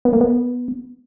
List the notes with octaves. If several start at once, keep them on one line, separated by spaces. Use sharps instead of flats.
B3
A#3
B3